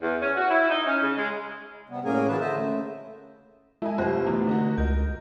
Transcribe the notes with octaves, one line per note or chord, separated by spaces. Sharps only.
E2
C#4
F#4
E4
D#4
C#4
C#3
G#3
C3 G3 B3
A2 A#3 C#4 G#4 A#4 G#5
A#2 E3 F#3 G#4 B4 A5
D3 C5 D#5 E5 A5
C#3 A3
G#3 E4 D#5 G#5
F1 F#2 F4 G4 C5
B2 E3 A3
D3 D#4 F#4
C#2 A#4 D#5 G6